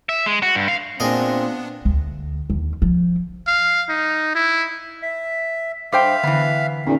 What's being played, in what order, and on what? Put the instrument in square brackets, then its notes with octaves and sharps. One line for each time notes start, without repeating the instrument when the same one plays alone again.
[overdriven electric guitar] E5
G#3
F#4
G2
F5
[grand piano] A#2 [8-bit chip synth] B3 D4 [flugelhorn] C4 [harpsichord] G#4 A#4 D#5
[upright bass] D2
D#2
F3
[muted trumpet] F5
D#4
E4
[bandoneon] E5
[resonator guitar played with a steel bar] G2 C5 G5 [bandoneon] E5 F5 [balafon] D6
[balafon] D3 [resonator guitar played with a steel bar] E3 B3
[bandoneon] E2 A#2 [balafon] A#3 C#4 D#4